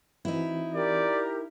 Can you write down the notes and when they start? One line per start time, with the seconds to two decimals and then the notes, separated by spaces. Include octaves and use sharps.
0.25 E3 C4 D#4 E4 F#4
0.74 G4 A#4 D5